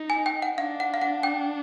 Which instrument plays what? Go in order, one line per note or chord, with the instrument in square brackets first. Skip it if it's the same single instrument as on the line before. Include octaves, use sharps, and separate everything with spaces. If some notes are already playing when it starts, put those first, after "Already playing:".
Already playing: [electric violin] D#4
[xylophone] G#5
G5
F#5
[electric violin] D4 [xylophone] F5
[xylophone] F#5
F5
F#5
G5